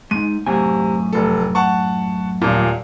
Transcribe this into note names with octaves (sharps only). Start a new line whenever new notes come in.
G#3 D#4 D#7
F#2 A2 C3 G#5
F1 A4
F#5 A5 C#6
D#1 A#2